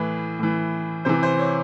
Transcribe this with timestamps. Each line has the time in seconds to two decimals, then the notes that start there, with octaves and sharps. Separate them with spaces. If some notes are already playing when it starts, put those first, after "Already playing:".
Already playing: A2 E3 B4
0.39 A2 E3
1.05 C3 E3 C5
1.23 C5
1.39 C#5